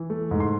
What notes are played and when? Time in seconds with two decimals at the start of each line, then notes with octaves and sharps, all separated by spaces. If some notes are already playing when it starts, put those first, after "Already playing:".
Already playing: E3
0.10 A3
0.31 G#2
0.40 C6